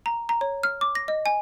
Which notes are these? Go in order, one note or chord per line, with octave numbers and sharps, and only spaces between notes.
A#5
A#5
C#5
F6
D6
A#6
D#5
G#5